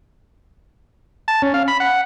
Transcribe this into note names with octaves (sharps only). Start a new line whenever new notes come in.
A5
C#4
F5
B5
F#5